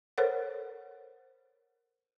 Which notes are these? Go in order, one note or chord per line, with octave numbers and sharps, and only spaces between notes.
A4 A#4 C5 C#5 F#5